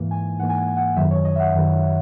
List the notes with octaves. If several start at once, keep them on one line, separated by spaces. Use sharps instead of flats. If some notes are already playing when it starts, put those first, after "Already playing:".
Already playing: G#2 E3 A#3
G#5
G#2 E3 A#3 F#5
G#5
F#5
G#5
F#5
F#2 D#3 F#3 E5
C#5
D#5
E5
F#5
F#2 D#3 F#3